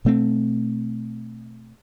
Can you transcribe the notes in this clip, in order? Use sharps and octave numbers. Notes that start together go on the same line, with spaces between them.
B2 A3 C4